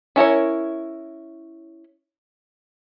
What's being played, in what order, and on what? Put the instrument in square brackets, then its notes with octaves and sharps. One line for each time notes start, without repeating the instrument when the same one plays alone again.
[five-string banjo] C#4 E4 A#4 C#5